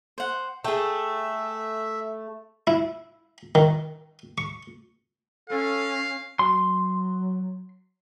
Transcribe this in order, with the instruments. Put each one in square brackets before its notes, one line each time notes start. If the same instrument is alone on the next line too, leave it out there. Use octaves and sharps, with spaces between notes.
[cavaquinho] C5 F#5
[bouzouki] A3 [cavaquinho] G#4 G5 [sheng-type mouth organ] E5
[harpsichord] E4
D#3
C#6
[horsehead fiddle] C#4 [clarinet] A4 [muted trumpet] F5
[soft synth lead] F#3 [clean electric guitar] C6